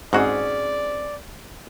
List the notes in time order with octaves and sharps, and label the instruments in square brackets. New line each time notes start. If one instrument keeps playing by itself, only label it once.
[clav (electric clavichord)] G#2 F#4 [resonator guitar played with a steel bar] C4 C#4 G#4 [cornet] D5